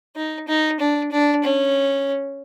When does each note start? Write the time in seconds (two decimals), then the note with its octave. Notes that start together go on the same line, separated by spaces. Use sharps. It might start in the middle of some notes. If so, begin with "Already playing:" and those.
0.16 D#4
0.48 D#4
0.80 D4
1.12 D4
1.44 C#4